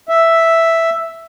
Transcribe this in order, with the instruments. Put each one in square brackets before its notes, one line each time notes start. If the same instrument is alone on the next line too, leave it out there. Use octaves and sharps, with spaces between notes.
[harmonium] E5